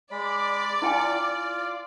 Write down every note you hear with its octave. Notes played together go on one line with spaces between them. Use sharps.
G#3 D5 B5
E4 F4 G5 G#5